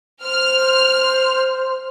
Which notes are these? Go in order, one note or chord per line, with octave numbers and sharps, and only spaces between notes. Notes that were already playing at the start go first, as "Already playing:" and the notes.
C5 F6